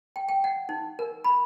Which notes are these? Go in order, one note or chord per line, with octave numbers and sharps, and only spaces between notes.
G5
G5
F#5
D#4
A#4
B5